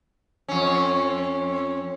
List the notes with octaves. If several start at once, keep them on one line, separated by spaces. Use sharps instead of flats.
F2 C#4